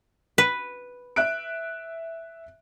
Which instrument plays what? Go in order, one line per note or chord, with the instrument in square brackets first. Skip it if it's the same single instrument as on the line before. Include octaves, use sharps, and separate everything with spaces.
[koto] B4
[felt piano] E5 F#6 D7